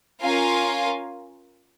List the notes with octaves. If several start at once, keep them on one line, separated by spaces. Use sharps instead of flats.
C#4 F4 A#4 F5 G#5